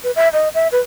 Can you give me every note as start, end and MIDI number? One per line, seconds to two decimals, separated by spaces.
0.04 0.11 71
0.16 0.29 76
0.33 0.49 75
0.54 0.68 76
0.72 0.79 71